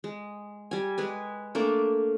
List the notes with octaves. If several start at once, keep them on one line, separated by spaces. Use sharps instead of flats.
G#3
G3 G#5
G#3 B4 G#5
A3 A#3 D4 D6